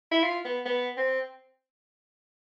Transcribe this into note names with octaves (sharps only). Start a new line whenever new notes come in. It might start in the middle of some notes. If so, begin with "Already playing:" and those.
E4
F4
B3
B3
C4